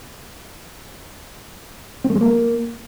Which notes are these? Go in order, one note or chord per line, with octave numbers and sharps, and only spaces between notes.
C4
A3
G#3
A#3